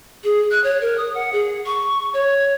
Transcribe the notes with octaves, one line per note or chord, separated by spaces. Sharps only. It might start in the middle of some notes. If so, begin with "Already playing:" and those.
G#4
F#6
C#5
A#4
D#6
F#5
G#4
C#6
C#5